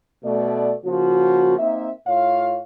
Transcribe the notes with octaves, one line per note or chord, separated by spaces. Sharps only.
B2 A3 D5
C#3 F3 A#3 F#4
A#3 C4 D#4 E5
A2 F4 C#5 F5